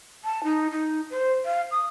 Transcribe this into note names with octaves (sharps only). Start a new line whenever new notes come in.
A5
D#4
D#4
C5
F5
D#6